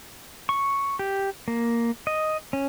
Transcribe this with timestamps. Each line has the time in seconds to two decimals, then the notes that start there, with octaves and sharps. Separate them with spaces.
0.49 C#6
0.99 G4
1.48 A#3
2.07 D#5
2.53 C#4